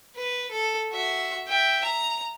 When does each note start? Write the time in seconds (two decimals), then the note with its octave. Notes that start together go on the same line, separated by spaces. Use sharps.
0.16 B4
0.51 A4
0.92 F#4 E5
1.47 E5 G5
1.84 A#5